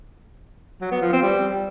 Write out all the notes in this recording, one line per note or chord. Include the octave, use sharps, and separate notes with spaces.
F#3
B3
F3
C4
G3